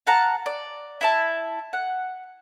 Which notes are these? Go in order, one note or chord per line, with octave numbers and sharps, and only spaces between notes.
F5 F#5 A5 A#5
D5
E4 E5 A5
F#5